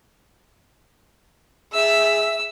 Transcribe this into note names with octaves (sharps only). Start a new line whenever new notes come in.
G#4 E5 E6